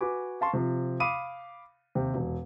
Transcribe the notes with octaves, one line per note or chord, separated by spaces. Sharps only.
F#4 B4 G#5 D6
F5 A5 C6 C#6
C3 F3
F5 B5 D6 D#6 D#7
D#2 C3 G5
E1